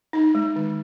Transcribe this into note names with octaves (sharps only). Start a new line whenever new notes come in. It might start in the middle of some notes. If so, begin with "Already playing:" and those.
D#4
G#3
D#3